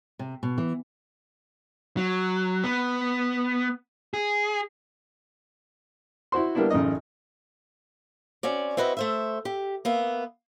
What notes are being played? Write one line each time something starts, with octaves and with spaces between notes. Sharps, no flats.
C3
B2
E3
F#3
B3
G#4
E4 F#4 C5 C6
G3 A#3 B3 D4 E4
A1 F#2 C#3 D#4 D#5
C4 C#4 F#4 D5
C4 E4 F#4 B4 D#5
A3 C5 E5
G4
A#3 B3 E5